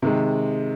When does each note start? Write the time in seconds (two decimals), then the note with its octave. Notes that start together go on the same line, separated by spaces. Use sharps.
0.02 C3 D#3 G#3